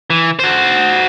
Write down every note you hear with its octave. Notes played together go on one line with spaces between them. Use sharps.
E3
F#4 C5